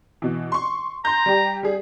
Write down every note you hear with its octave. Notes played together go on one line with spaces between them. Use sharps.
B2 E3
C6 C#6
A#5 C6 G6
G3 G4
G3 G#4